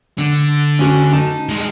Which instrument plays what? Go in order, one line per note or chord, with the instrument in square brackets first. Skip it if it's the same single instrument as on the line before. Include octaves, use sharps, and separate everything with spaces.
[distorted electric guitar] D3
[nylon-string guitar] C#4 F#4
D#4 A5
[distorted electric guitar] G3 G#3